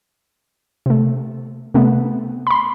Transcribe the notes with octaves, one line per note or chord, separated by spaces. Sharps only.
C3 A3
C3 A3 B3
B5 C6